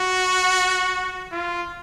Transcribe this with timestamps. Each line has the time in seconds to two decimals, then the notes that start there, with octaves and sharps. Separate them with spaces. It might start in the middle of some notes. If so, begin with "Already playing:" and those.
Already playing: F#4
1.32 F4